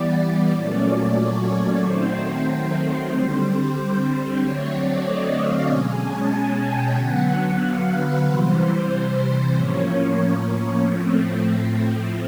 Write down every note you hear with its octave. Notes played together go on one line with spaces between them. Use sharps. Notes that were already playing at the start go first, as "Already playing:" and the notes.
Already playing: E3 G3 B3 D5
A#2 F#3 A3 C#4 D5
C#5
C#5
D#3 F#3 A3 C4 C5
C5
D3 G3 C4 C5
D3 F#3 A3 C4 C#5
D5
D#5
F5
B2 G#3 C#4 G#5
A5
G#5
G5
D3 F#3 B3 F#5
F5
B4
C3 E3 G3 C5
A2 F3 A#3 C#4 C#5
A2 F3 A3 C4